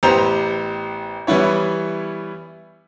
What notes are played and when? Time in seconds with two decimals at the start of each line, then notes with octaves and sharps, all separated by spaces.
0.03 A1 B3 G4 C5 A#5 F7
1.27 E3 G3 B3 E4 C#5